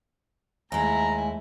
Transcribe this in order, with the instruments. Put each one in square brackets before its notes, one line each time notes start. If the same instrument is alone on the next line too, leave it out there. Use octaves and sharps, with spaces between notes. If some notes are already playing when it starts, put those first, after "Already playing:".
[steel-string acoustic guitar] D#2 G#3 [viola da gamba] A3 E4 [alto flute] G#5 [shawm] A#5